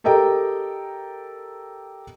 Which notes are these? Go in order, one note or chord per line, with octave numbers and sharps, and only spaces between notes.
G4 A4 A#4 D#5 G5 A#5